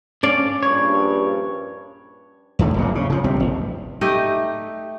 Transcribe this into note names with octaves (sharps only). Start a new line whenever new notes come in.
C#4 D4 D5 F5
A#1 G2 C#5
D#2 A2 D3 A3
F#1 E2 A#2
C#3
C#3 F3
A#1 G3 C4
F1
A3 D#4 G4 D#5